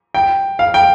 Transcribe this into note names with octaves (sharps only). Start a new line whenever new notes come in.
G5
F5
G5